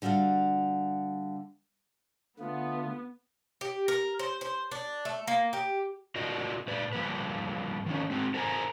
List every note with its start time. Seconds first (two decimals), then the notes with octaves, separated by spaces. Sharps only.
0.02 D3 G3 F#4 F5 F#5
2.40 D3 A3 B3 F4
3.61 G4
3.88 A#4
4.19 C5
4.41 C5
4.71 D4
5.05 A3
5.27 A#3
5.53 G4
6.16 F4 F#4 A#4 D5 D#5
6.67 A#2 B4 D5
6.93 G2 F3 A#3 B4
7.86 D#3 F3 C#4
8.10 G#3 C4 F#4
8.34 A4 A#4 C5 G5 G#5 A#5